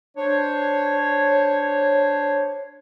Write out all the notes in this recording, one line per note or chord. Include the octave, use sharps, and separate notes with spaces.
D4 C5 C#5